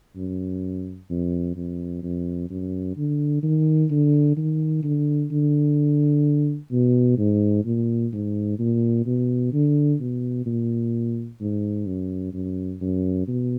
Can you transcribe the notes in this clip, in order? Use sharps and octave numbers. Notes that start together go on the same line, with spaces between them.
F#2
F2
F2
F2
F#2
D3
D#3
D3
D#3
D3
D3
B2
G#2
A#2
G#2
A#2
B2
D3
B2
A#2
G#2
F#2
F#2
F#2
B2